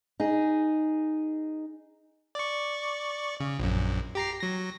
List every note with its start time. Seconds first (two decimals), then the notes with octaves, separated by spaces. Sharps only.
0.20 D#4 G#4
2.35 D5 C#6
3.40 C#3
3.59 A#1 F#2
4.15 G4 A#5 C7
4.40 F#3 A#6